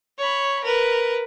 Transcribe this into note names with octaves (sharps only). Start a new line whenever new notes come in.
C#5 B5
A#4 B4